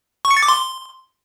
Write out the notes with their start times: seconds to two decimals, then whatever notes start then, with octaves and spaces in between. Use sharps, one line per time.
0.25 C#6
0.31 C#7
0.37 A6
0.43 D6
0.48 C6